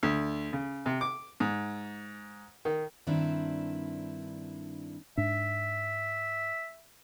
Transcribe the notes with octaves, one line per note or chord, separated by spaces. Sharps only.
D2
C#3
C3
D6
G#2
D#3
G2 D#3 C4 D4 E4
G#2 D4 E5